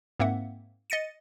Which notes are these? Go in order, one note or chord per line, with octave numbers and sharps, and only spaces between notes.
G#2 A#3 C4 E5 F#5
D#5 A6 C#7 D#7